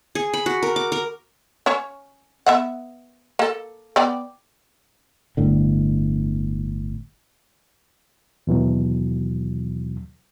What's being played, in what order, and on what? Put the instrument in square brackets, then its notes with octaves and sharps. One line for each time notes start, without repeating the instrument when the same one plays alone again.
[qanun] G#4
B5
F#4
A#4
D6
A#4
[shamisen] C#4 C#5
B3 E5 F#5
A#3 A4
B3 D5 G5
[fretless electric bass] G1 A2 D3
[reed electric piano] D#2 B2 E3 F#3